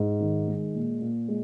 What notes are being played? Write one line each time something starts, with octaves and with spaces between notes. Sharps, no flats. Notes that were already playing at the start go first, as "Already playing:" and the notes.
Already playing: G#2
D#3
G#3
A#2
A#2
G#3